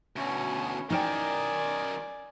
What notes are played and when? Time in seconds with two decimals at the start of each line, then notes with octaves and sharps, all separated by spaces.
0.16 D2 B2 C#4
0.90 F#2 D#3 D#4 A#4 D5 G5 G#5